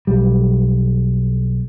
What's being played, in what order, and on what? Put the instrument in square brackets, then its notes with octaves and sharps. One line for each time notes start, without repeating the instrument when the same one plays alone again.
[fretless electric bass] B1 G3